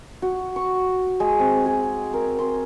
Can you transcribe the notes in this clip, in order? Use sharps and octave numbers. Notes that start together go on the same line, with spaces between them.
F#4
C#6
G#3
C4
G#4
A#4
C6